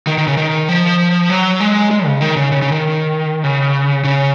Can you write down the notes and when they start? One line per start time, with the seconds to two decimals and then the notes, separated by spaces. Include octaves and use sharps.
0.07 D#3
0.18 D#3
0.27 C#3
0.37 D#3
0.68 F3
1.30 F#3
1.60 G#3
1.91 G#3
2.06 C#3
2.21 D#3
2.36 C#3
2.52 C#3
2.62 C#3
2.72 D#3
3.44 C#3
4.04 C#3